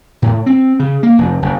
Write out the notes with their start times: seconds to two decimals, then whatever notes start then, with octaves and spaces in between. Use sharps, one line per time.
0.22 A2
0.46 C4
0.79 C#3
1.03 A#3
1.18 F1
1.42 F#1